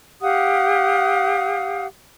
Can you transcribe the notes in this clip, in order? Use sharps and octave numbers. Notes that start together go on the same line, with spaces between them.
G4 F5 F#5 D#6